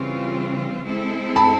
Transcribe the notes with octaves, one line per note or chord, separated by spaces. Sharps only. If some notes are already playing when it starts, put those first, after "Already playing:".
Already playing: C#3 E3 G3 C4 F4 C#6
G#3 C4 E4 A4
A5 B5